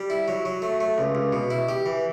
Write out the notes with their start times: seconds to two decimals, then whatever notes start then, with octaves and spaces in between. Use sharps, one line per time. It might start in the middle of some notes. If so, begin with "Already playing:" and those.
Already playing: G3
0.10 E4
0.28 F#3
0.45 F#3
0.62 A3
0.81 A3
0.98 C#2
1.15 C#2
1.33 B2
1.50 E4
1.69 G4
1.86 E3